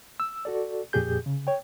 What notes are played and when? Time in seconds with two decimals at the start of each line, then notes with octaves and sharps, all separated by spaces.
0.20 E6
0.45 F#4 A4 D5
0.93 F2 A#2 G4 G#4 G6
1.26 C#3
1.47 C#5 G5